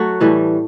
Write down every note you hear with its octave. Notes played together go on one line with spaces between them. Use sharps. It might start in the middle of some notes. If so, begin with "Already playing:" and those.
Already playing: F#3 A3 F#4
A2 E3 G3